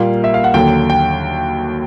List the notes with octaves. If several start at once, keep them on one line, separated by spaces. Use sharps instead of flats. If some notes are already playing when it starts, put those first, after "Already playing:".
Already playing: A#2 G3 A#3 F5
E5
F5
F#5
D#2 D3 F#3 G5
G5